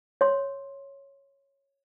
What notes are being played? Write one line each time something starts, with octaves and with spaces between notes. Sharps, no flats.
C#5 C6